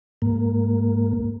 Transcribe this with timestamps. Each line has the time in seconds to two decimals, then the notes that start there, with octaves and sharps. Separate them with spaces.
0.22 G#2 A#3